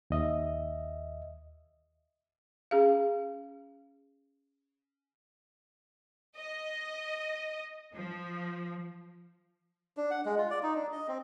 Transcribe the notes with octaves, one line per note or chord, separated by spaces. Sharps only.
D#2 D#5 E5
C#4 G#4 F5
D#5
F3
D4
F#5
G#3
F4
D5
D#4
D4
D#5
C4